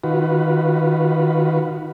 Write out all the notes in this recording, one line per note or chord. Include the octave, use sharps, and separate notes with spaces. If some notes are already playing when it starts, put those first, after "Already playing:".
D#3 F4 F#4 B4